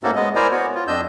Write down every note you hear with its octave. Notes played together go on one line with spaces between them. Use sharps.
G#2 A3 A#3 C#4 F#4 A4
G#3 B3 D#5
E4 A#4 C5 D5 G#5 A#5
B3 F#4 C#5
F4
F2 D4 D#5 E6 G6